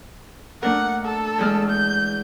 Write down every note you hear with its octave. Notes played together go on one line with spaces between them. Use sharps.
A3 D4 A#4 F#5
A4
E2 G#3 F6
G6